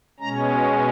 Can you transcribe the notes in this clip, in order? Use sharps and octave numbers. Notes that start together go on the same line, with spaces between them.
B2 G#3 C#4 A#5